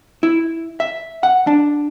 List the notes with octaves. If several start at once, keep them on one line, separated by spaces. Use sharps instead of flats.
E4
E5
F#5
D4